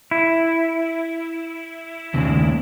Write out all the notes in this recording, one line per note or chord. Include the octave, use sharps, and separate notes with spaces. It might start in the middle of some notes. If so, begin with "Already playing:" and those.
E4
D#2 C#3